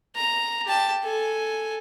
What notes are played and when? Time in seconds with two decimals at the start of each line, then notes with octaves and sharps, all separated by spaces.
0.16 A#5
0.65 G4 A5
1.03 A4 G#5